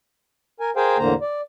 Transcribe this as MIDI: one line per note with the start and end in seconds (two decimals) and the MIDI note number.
0.60 0.70 70
0.60 0.70 80
0.76 0.97 68
0.76 0.97 70
0.76 0.97 72
0.76 0.97 77
0.76 0.97 79
0.76 0.97 80
0.98 1.14 40
0.98 1.14 45
0.98 1.14 50
0.98 1.14 58
0.98 1.14 72
0.98 1.14 82
1.21 1.41 74